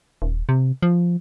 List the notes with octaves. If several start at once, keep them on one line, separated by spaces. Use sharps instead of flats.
D#1
C3
F3